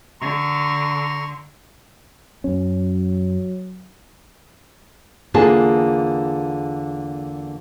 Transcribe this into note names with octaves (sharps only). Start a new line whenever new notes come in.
D3 A#5 C6 C#6
F#2 F#3 C#4
E2 D3 A#3 F4 G#4 A5